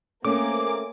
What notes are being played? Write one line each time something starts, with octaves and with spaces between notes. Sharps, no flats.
A3 A#3 C4 C#4 G#4 D6